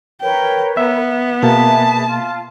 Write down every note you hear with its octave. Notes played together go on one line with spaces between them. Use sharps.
A#4 B4 C#5 G5
B3 E5
B2 A#3 G#4 B4 E5 A5
F4